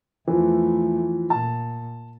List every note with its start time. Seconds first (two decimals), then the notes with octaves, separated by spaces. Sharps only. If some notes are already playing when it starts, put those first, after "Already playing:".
0.28 E2 E3 F3 A3
1.30 A#2 A5